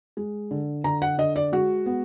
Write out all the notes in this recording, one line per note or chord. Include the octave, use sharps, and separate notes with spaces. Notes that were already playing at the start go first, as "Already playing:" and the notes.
G#3
D3
D3 A#5
F#5
D3 D#5
D5
G#3 F#4
B3